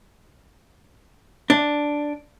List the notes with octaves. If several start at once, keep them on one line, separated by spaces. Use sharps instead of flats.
D4